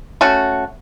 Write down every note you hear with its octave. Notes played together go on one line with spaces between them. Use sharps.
A3 C#4 F#4